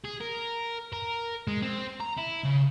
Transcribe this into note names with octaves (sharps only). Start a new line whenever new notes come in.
G#4
A#4
A#4
G#3
C4
A#5
E4
C#3